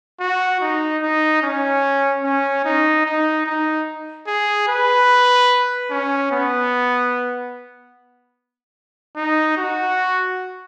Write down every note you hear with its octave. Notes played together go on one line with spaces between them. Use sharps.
F#4
D#4
D#4
C#4
C#4
D#4
D#4
D#4
G#4
B4
C#4
B3
D#4
F#4